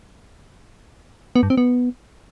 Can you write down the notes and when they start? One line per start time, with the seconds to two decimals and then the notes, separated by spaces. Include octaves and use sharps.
1.36 B3
1.43 G2
1.50 C4
1.57 B3